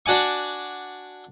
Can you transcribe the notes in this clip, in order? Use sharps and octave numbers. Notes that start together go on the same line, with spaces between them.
D4 F#4 D5 G#5 C#6